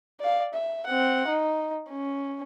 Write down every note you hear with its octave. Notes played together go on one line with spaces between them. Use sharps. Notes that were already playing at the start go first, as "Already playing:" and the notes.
D5 F5
E5
C4 F#5
D#4
C#4